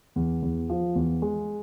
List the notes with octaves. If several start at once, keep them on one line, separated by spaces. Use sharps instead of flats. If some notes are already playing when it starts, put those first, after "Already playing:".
E2
E2
F3
E2
G#3